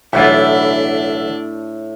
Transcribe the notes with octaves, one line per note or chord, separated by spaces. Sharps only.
B1 A2 E3 D4 F4 E5 F#5